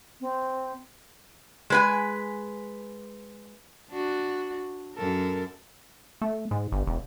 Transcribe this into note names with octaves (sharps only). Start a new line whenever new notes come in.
C4
G#3 B4 G#5
D4 F#4
F#2 A4 A#4
A3
G#2
G1
E1